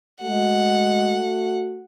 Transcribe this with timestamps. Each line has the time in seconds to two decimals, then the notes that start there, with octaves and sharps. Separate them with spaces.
0.22 G#3 A3 F#4 F#5